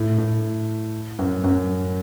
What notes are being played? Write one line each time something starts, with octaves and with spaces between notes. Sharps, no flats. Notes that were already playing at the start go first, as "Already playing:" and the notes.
Already playing: A2
A2
F#2
F#2